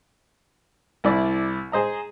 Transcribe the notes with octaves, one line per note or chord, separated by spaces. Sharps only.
C2 E4 D5
G#4 C5 D#5 A#5